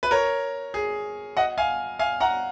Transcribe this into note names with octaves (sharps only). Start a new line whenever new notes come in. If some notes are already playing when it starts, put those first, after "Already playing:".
B4
A#4 C#5
G#4
D#5 F#5
F5 G#5
F5 G#5
F#5 A#5